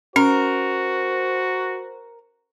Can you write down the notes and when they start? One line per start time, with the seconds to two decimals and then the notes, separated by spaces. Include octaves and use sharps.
0.16 C#4 F#4 A#4 C5